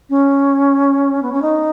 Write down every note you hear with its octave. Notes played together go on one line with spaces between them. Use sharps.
C#4
B3
C#4
D#4